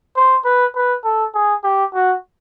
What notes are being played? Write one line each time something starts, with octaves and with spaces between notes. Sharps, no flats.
C5
B4
B4
A4
G#4
G4
F#4